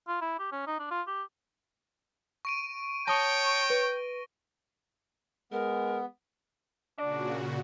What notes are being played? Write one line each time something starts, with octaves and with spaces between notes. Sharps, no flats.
F4
E4
G4
C#4
D#4
D4
F4
G4
C#6 D7 D#7
C#5 G5 A5 D#6 A#6 G7
B4
G#3 B3 A#4
A#2 C#3 D4 F#4 D5